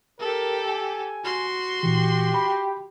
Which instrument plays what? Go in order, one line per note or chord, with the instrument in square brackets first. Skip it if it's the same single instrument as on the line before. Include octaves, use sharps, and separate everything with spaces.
[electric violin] G4 A4 [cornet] A#4
[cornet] G#5
[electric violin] F#4 C6
[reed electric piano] A#2 E3 [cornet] G4
[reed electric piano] B5